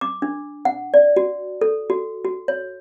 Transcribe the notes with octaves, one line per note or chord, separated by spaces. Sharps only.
D6
D4
F#5
D5
F#4
A4
F#4
F#4
C#5